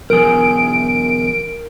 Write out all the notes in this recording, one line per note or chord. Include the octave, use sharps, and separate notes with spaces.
B1 E2 G#4 A#4 D7